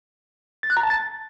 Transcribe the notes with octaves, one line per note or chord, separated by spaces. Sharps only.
A6
F#6
A#5
A5
A6